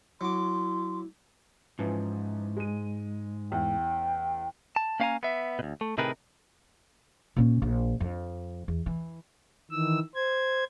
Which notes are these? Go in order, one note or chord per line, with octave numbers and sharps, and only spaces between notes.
F#3 E4 C6 D6
G#2 E3 F3 C#4
G#3 D#7
A1 E2 G5
A5
A#3 C#4 F5 G5 G#5 A#5
B3 E5
D2 B2
A3
A2 C3 D#3 G#4 A#4 B4
A#2 C#4
A#1
F2
E2
E3
D#3 E3 E6
C5 G#6